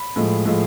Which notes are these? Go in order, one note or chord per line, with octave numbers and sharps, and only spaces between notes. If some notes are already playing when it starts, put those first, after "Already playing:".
Already playing: B5
A2 F3 G#3
A2 F3 G#3